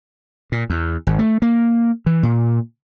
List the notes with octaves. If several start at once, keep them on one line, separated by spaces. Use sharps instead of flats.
A#2
E2
G#1
A3
A#3
E3
A#2